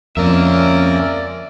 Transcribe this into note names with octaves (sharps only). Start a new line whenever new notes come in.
F2 G#3 A#3 C4 C#4 A#4 D5 E5